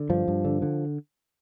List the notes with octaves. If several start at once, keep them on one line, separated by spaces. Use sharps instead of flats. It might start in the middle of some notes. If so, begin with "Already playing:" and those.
Already playing: D3
G2 F3
G2
D3
D3